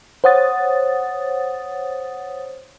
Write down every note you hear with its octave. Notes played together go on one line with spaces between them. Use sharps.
C5 C#5 F#5 D#6 A6